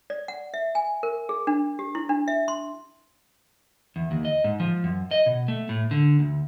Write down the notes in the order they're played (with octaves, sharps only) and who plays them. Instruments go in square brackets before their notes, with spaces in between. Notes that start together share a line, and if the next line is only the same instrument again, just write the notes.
[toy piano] D5
F#5
E5
G#5
A#4
G#4
D4
G4
E4
D4
E5
C6
[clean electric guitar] E2
D#2
D#5
G#2
F3
F#2
D#5
B2
A3
A2
D3
D2